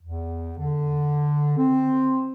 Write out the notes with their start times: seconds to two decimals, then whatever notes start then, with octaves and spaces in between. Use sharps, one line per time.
0.02 E2
0.58 D3
1.58 C4